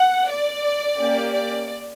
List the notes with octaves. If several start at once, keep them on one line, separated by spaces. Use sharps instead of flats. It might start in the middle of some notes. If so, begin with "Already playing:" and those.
Already playing: F#5
D5
A#3 C#4 G4
D5